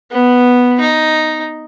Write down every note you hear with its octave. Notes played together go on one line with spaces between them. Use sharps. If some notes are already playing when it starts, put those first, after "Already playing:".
B3
D#4